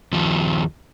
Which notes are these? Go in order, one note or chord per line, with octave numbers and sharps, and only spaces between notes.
D#2 F3